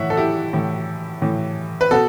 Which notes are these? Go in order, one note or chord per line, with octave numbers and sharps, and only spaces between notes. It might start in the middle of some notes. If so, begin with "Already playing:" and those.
Already playing: A2 E3 C#5 E5 F#5
A4
E4 G4
A2 E3
A2 E3
B4
B2 F#4 A4